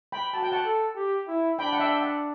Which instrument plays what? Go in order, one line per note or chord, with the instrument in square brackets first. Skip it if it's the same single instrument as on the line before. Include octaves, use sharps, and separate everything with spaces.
[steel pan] G5 B5
[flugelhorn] F#4 [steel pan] A5
[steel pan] G5
F#5 A5
[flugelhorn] A4
G4
E4
[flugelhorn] D4 [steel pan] G5 B5
[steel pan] F#5
E5 G5
F#5 A5